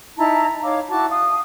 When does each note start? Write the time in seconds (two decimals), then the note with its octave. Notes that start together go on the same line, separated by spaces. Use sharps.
0.17 D#4 E4 A5 A#5
0.63 D#4 C#5 F5 D6
0.89 E4 F#4 A5 D6
1.10 F5 D#6